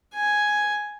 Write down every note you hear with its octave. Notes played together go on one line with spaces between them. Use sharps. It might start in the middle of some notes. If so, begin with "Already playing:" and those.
G#5